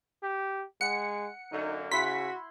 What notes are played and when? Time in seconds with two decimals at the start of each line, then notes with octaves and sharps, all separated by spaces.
0.23 G4
0.81 G#3 F#5 C#7
1.52 F#2 D3 A#3 D#4
1.91 C#3 E4 F#4 B5 C6 B6